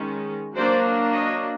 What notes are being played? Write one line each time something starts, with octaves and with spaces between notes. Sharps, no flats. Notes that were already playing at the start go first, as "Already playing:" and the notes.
Already playing: D#3 G#3 C#4
F#3 A#3 D4 C5 D5
C#5 D#5